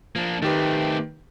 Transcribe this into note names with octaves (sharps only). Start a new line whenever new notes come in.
F3 A#3 D4
D#3 A3 C4 G4 B4